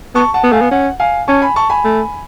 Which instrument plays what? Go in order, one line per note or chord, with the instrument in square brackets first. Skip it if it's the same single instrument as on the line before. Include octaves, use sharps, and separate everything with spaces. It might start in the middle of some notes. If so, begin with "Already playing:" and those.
[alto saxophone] B3 [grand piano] A5 C#6
[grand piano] F#5 A5
[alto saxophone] B3
[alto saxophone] A3 [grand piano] F5 G#5
[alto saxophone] B3
[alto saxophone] C#4 [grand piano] F#5
[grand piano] F5 G#5
[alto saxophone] C#4 [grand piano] A5 C#6
[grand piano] G#5 B5
A5 C#6
G#5 B5
[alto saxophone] A3